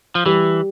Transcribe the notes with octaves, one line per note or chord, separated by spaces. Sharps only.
F3
E3 G3